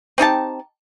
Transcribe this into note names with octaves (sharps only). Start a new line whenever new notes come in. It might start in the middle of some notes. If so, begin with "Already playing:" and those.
C4 D#4 G4 A5